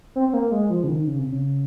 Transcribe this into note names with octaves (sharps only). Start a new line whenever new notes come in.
C4
C4
A#3
G#3
F3
C#3
D#3
C#3
C3
C#3